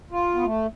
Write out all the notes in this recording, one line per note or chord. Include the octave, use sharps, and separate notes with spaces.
F4
B3
A3